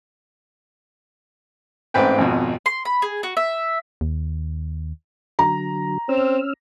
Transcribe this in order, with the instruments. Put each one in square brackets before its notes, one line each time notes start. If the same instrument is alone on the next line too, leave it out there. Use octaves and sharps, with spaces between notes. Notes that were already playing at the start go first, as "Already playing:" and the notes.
[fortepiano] A1 G#2 C4 B4 G5
G#1 F2 B2
[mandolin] C6
B5
G#4
F#4
E5
[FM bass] D#2
[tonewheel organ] D3 F#3 [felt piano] A#5
[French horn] C4 [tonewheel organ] C#4 E6 F6